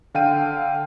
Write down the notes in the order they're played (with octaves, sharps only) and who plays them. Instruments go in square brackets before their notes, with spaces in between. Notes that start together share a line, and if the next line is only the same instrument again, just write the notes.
[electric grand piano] D3 F5 G5 D#7